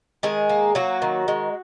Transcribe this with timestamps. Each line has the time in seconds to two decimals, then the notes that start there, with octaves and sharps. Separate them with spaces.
0.23 D#3 G#3 G#4
0.50 A#3
0.75 F#3 A#3 F#4
1.02 D#3
1.28 G#3